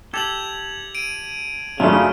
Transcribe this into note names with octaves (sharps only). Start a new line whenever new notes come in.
G4 A4 G#6 F7 F#7
D7 D#7
F#2 C#3 A3 C#4 D4 F4 F6